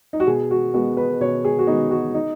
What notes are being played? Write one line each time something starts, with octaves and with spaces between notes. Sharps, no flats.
D#4
F#4
B2 G#4
F#4
G#3 B3 F#4
B4
B2 C#5
G#4
F#4
G#3 B3 D#4
F#4
D#4